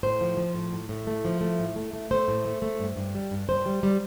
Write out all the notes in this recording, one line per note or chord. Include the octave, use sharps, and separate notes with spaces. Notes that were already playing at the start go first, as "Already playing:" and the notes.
A2 C5
F3
F3
A2
A2
A2
A3
F3
A3
A2
A3
A3
A3 C5
A2
A3
A3
G2
G2
G3
G2
G2 C5
G3
G3